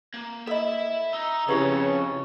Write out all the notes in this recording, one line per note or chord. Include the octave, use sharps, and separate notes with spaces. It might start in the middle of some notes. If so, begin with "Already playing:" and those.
A#3
A4 D#5 E5 B5
D#4 E5
F2 C#3 E4 G4 B4 C#5